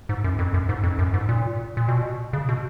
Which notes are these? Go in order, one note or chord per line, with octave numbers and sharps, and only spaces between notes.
G#2
F#2
F2
F#2
G#2
F2
F#2
G#2
A#2
A#2
B2
C#3
B2